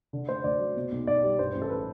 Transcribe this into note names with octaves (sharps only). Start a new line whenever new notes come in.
D3
A3 C5
D2 D5
F#3
B2
B1
B1 D5
G3
G2 C5
A1
A4
B4